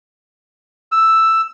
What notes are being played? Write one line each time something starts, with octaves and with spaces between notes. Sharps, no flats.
E6